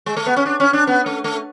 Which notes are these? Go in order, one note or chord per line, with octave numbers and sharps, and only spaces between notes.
G#3
A3
B3
C#4
D4
C#4
D4
B3
A3
A3